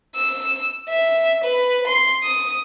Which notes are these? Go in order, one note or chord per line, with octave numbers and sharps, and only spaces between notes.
E6
E5
B4
C6
D#6